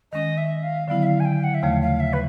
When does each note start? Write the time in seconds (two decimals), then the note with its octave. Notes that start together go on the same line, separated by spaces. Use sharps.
0.12 D#3 G#3 C#4 D#5
0.37 E5
0.63 F5
0.88 D3 F#3 B3 E4 F5
1.03 E5
1.06 F5
1.20 G#5
1.25 G5
1.44 F#5
1.54 E5
1.62 D#2 C#3 F3 A3 F5
1.82 F5
2.00 E5
2.13 B4